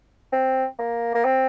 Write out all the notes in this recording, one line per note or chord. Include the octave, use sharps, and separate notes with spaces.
C4
A#3
A#3
C4